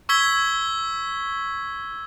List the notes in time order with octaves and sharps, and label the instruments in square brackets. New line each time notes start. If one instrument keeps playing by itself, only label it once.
[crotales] C#6 E6 G#6 B6 G7